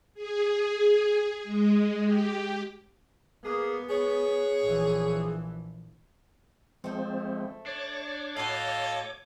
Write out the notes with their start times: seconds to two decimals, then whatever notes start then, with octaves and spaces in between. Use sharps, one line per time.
0.14 G#4
1.44 G#3
2.03 G4
3.45 A#3 B3 G#4
3.90 G#4 C#5
4.64 A#1 E3
6.84 F3 G#3 A3 C4 C5
7.67 D4 C#5 D6
8.37 A2 F#4 A4 D#5 F5